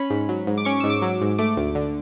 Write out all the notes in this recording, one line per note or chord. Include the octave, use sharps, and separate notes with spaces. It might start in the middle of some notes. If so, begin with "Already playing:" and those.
Already playing: C#4 B5
G#2
F#3
G#2
D6
C#4 C#6
G#2 E6
D6
F#3
G#2
A3 D6
D2
D3